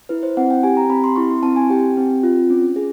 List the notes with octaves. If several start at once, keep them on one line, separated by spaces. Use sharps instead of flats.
E4 B4
C5
C4 F#5
G5
G4 G#5
A#5
C4 B5
C6
E4 C#6
C6
C4 A5
G#5
G4 G5
C4
F4
C#4
G#4